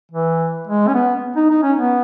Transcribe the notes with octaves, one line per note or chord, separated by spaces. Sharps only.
E3
G#3
C#4
B3
D#4
D#4
C#4
B3